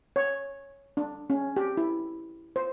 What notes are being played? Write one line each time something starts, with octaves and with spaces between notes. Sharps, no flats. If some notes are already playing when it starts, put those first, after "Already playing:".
C#5
D4
C#4
G4
E4
C5